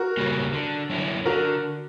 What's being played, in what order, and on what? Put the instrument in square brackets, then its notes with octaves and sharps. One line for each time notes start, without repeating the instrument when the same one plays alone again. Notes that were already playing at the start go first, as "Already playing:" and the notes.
Already playing: [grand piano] F#4 A#4
[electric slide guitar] C#3 G3 A#3
D3
F#3 C#4 E4
[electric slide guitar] D3 [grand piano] F#4 A#4